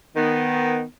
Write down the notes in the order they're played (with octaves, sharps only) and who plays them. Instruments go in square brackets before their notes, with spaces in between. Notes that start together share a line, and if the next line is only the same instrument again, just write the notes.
[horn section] D#3 B3